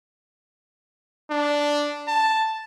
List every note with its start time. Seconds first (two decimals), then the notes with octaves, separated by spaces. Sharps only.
1.30 D4
2.08 A5